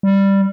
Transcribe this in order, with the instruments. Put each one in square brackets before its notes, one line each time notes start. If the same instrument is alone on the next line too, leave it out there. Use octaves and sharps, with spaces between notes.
[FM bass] G3